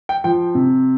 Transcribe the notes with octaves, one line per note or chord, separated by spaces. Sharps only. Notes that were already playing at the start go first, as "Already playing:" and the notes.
G5
F3 G5
C3